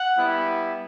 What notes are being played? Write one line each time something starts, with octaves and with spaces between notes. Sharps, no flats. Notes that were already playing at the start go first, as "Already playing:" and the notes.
Already playing: F#5
G3 B3 E4